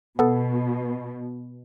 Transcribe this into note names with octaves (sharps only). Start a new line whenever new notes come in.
B2 B3 A4